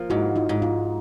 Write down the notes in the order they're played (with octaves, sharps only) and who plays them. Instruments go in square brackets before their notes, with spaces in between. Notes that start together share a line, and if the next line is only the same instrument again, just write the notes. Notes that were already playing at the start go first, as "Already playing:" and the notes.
Already playing: [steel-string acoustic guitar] F3 A#3
[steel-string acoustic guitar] G#2 [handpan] E4 F#4
[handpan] D#4 F4
[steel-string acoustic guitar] G#2
[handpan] D#4 F4